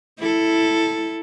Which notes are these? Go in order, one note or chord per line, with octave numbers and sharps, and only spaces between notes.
E4 A4